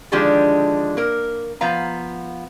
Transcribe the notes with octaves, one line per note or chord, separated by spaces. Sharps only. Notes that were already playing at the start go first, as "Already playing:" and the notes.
D3 D#3 F3 G#3 D4 G4
A#3 A#4
F3 B3 F5 A#5